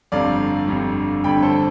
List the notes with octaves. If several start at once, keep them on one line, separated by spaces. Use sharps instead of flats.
G1 F2 D3 G3 D5 F5
G1 F2 D3 G3
G1 F2 D3 G3 G5 B5
A4 C5